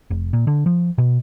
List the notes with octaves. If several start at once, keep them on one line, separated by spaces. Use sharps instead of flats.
F1
A#2
D3
F3
B2